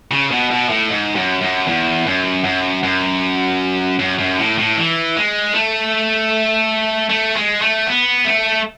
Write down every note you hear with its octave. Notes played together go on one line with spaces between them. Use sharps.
C#3
B2
B2
A2
G#2
F#2
F#2
E2
F#2
F#2
F#2
F#2
F#2
A2
A2
E3
G#3
A3
A3
G#3
A3
B3
A3